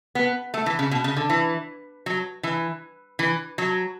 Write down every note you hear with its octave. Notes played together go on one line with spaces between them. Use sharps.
B3
A3
E3
C#3
B2
C#3
D3
E3
F#3
E3
E3
F#3